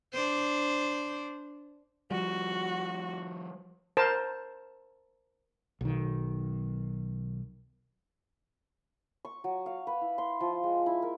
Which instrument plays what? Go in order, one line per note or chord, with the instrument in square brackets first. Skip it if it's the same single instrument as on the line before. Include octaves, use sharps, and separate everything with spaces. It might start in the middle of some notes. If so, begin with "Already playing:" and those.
[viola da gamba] D4 C5
[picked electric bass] F3 G3 [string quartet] F#4
[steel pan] A#4 C5 A5
[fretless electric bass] B1 D#3
[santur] C#6
F#3
F5
B4
E4
C6
F3
G#3
E4
A#4